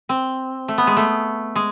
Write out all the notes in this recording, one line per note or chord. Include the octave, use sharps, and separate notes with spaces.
C4
A3
B3
G#3
A3
G#3